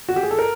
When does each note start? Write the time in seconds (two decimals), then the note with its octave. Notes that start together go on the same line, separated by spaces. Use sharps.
0.09 F#4
0.16 G4
0.23 G#4
0.31 A4
0.39 A#4